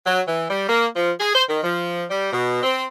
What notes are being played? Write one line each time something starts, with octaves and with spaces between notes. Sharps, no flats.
F#3
E3
G3
A#3
F3
G#4
C5
D#3
F3
G3
B2
C4